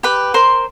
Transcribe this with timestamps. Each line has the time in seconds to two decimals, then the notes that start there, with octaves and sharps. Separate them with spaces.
0.03 G4 B4 B5
0.34 A#4 C5 C6